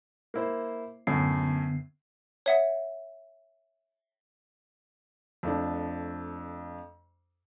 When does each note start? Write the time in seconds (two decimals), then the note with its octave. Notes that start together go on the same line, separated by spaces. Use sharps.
0.34 A#3 E4 C5
1.07 F#2 A2 D3 B3 C7
2.46 C#5 E5 F#5
5.43 F2 A3 D4